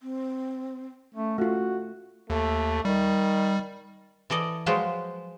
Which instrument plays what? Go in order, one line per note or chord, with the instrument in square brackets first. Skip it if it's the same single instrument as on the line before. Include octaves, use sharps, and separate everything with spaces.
[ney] C4
[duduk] A3 [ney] C#4
[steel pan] A3 F4 [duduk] F#4
[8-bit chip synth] D#2 [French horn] A3
[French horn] D#3 [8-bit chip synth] G3
[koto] E3 A4 D5 D#5
F3 F#3 G#3 F4 B4 C5